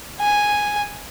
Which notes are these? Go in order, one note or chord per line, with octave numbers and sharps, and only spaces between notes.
G#5